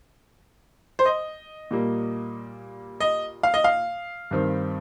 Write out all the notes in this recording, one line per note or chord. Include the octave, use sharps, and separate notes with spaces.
C5
D#5
A#2 G3 A#3
D#5
F5
D#5
F5
G2 D#3 C4